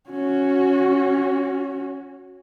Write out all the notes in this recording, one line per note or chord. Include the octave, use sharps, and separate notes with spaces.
C#4 F#4